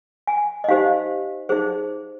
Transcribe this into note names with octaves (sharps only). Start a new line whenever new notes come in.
G#5
D#5
D#4 G4 C5 F5
D#4 G#4 C5